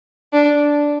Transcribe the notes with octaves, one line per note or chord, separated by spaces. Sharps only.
D4